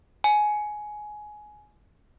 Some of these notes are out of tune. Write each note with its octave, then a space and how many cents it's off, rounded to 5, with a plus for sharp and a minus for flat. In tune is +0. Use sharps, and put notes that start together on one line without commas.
G#5 +15